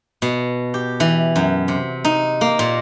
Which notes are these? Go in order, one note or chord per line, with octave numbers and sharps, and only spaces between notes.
B2
G4
E3
F#2
C3
D#4
A#3
A#2